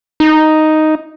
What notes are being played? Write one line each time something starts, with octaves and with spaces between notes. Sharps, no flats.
D#4